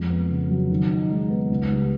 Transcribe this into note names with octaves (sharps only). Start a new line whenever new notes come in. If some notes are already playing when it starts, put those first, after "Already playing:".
Already playing: F2 G#3
B3
C#3
F#3
D#3
D#4
G#3
B3
C#2
G3